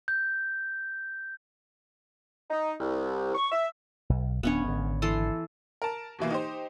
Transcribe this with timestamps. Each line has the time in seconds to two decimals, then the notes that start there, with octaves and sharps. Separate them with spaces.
0.08 G6
2.50 D#4
2.80 C2
3.35 C#6
3.52 E5
4.10 B1
4.43 D1 B3 C#4 D4 C#5
4.64 G#1 D3
5.02 E3 A4 C6
5.82 A#4 A5
6.19 D#2 B2 E3 A#3
6.30 D#4 G4 C5